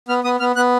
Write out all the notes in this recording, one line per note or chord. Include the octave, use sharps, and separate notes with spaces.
B3 F6
B3 D#6
B3 F6
B3 F#6